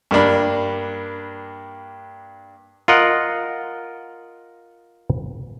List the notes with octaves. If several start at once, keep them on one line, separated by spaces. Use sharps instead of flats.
G2 A#3 D4 B5
F4 A#4 D#5 F#5